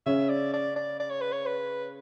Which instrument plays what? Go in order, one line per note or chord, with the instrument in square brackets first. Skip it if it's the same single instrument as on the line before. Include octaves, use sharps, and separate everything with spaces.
[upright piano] C#3 C#4 [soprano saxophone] E5
[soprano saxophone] D5
D5
D5
D5
C#5
B4
C#5
B4